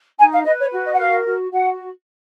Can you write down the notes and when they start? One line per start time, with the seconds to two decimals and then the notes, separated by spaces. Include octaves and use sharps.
0.19 D#4 G#5
0.33 F5
0.45 B4 D#5
0.59 C#5
0.72 F#4
0.86 D#5
0.93 F#5
0.98 A#4 F5
1.25 F#4
1.51 F#4 F#5